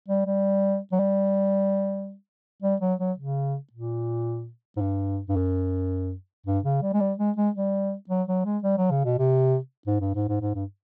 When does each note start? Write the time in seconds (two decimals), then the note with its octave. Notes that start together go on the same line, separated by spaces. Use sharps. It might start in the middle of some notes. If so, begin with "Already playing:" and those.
0.08 G3
0.26 G3
0.92 F#3
1.00 G3
2.62 G3
2.81 F#3
2.99 F#3
3.18 C#3
3.73 A#2
4.76 G#2
4.81 G2
5.29 G2
5.36 F#2
6.46 G2
6.64 C#3
6.82 G3
6.93 G#3
7.00 G3
7.18 G#3
7.37 G#3
7.55 G3
8.10 F#3
8.28 F#3
8.45 G#3
8.63 G3
8.78 F#3
8.91 C#3
9.05 B2
9.19 C3
9.87 G#2
10.01 G2
10.14 G#2
10.28 G#2
10.41 G#2
10.55 G2